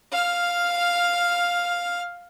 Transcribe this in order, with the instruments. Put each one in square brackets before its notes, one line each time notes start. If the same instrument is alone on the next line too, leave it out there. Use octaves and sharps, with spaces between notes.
[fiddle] F5 F6